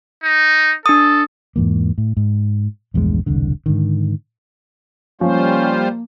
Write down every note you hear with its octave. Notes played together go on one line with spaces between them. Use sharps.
D#4
D4 A4 D#6
E2 G#2 E3 A#3
A2
G#2
A#1 E2 G2 G#3
E1 C2 D3
G#2 D3 D#3
F3 G3 A#3 C#4 F4 C5